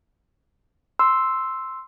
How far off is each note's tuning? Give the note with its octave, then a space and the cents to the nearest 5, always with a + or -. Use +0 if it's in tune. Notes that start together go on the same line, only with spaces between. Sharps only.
C6 +0 E6 +0